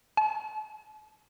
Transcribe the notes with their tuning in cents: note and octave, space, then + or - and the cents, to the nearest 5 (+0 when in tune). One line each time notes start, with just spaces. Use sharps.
A5 -40